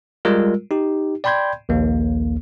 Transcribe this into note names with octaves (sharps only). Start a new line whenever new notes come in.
G3 G#3 F4 A#4
D#4 G4
D5 G5 B5 C6 G6 G#6
A#1 D#2 A#3